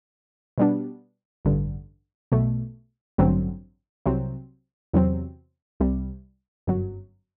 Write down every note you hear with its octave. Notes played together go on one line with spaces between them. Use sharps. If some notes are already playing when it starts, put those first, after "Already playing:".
B2 G3 B3 D4
A1 G2 D3
B1 B2 A3
A1 G2 D3 F#3 C4
C2 C3 F#3 C4
E2 C3 F#3 C4
C2 C3 G3
G1 F#2 F#3